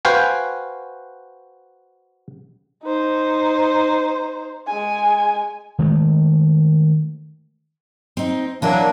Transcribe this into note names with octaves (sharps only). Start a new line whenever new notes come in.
F#4 B4 C5 F5 G5 G#5
D#4 C5
G#3 G#5
D#3 G#3 A3
C4 D#4
E3 F#3 A#3 D4 E4 A#4